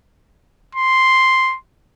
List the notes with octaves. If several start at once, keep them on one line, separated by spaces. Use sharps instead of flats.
C6